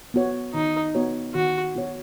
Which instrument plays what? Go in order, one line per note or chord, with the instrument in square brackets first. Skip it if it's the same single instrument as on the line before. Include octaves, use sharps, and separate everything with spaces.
[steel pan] B3 F#4 C#5
[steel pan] D#3 [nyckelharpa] D#4
[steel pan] B3 F#4 C#5
[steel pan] D#3 [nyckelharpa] F#4
[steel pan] B3 F#4 C#5